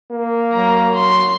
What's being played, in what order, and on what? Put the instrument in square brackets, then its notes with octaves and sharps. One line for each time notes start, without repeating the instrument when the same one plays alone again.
[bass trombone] A#3
[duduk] F#3 [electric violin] A#5
[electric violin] C6